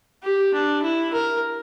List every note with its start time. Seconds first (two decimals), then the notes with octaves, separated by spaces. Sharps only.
0.23 G4
0.53 D4
0.82 E4
1.13 A#4